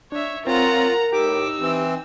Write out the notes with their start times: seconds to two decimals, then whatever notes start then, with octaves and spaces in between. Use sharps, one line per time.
0.12 D4 C#5 E5
0.47 C4 F4 A#4 C#5 F#5 A#5
1.12 A2 D#4 G4 D6 E6
1.60 E3 C4